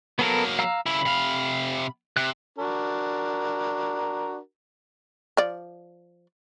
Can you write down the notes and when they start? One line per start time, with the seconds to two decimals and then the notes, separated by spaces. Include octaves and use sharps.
0.19 F#3 A#3 B3 A4 A#4
0.59 F5 A#5 E6
0.86 C#3 E4 B5
1.06 C3 F5
2.17 C3 F#6
2.59 D4 F#4 A#4
5.37 F3 D5